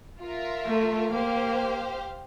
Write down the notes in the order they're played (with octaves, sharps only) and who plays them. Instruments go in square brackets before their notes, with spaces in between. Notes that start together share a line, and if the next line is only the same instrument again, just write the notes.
[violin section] F4 A#4 E5
[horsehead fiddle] A3
[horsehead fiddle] A#3 [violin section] G4 C5 F5